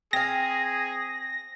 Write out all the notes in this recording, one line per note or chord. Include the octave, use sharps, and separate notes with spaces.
C4 G#4 F5 A#6